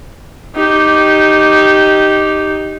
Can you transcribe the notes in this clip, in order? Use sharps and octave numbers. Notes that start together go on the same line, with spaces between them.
D#4 G4